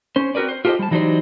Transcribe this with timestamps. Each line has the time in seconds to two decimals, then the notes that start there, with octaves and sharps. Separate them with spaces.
0.16 C#4 C5
0.35 C4 F#4 A#4 B4 D5
0.49 C5
0.65 F4 G4 A4 A#4 C5 D#5
0.79 G3 A5
0.91 E3 F#3 D#4 G4 C5 D5